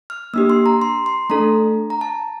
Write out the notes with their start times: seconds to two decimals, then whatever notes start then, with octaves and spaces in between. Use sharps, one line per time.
0.10 F6
0.34 A#3 D4 G4 E6
0.50 C6
0.66 A#5
0.82 C6
1.06 C6
1.30 A3 D4 A4 A#5
1.90 A#5
2.01 A5